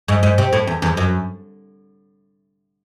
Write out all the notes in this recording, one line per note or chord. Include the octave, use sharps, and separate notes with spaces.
G#2
G#2
C3
A2
E2
E2
F#2